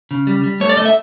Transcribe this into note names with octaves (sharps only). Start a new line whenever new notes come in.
C#3
G3
G3
A3 C#5
D5
A3 D#5
E5